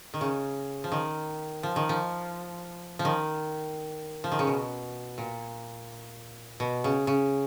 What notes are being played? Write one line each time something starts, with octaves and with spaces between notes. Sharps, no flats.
D#3
C#3
F3
D#3
F3
D#3
F3
F3
D#3
F3
D#3
C#3
B2
A#2
B2
C#3
C#3